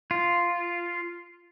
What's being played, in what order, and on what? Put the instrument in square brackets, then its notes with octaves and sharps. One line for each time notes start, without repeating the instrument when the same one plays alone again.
[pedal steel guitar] F4